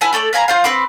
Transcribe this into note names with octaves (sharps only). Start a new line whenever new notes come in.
E4 B4 G#5 A5
A3 A4 B4 D5
B4 F5 G#5 A#5
F4 C5 F5
C4 B4 C6 D6